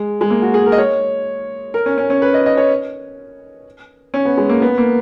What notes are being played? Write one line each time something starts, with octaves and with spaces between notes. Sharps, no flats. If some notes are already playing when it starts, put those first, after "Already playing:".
Already playing: G#3
G#3
A#3
F#4
G#4
A#4
D#5
C#5
A#4
C#4
C#4
C#4
B4
D#5
D#5
C#5
C#4
B3
G#3
A#3
B3
A#3